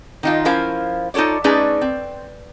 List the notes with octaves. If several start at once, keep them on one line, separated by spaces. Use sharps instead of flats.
D#3 D#4 F4
F3 C#4 E4 A#4 C5 F5
D#4 F4 A4 C#5 D5
A3 C#4 D#4 G#4 B4 D5
C4